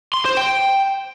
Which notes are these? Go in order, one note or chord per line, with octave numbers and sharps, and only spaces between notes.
C6
C5
G5